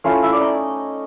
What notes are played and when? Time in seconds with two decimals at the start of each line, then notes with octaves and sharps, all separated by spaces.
0.04 A3 C#4 E4 F4 F5
0.23 E4 E5
0.32 D5
0.41 D#4 D#5